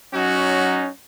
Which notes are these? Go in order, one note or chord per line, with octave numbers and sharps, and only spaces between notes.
F#3 C#4 D#4 F#4